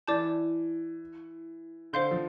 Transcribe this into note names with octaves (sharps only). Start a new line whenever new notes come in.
E3 D5 A5 D6 G6
D3 C5 F5 C6 G6
F3